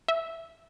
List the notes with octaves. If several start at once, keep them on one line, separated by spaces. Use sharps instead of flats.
E5